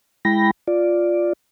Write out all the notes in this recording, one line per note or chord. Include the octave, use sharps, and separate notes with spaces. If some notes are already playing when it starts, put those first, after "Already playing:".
G#3 E4 G5 B5 A#6
F4 D5